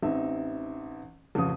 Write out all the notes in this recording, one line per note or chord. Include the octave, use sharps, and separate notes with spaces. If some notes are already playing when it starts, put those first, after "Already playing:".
A1 C4 D#4 E5
A1 F2 C#3 D#6